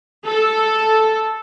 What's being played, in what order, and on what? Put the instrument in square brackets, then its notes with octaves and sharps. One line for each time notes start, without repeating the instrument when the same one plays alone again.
[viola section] A4